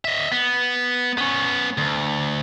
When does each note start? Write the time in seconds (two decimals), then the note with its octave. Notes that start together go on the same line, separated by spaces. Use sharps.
0.05 D#5 E5
0.32 B3
1.18 B3 C#4
1.78 D2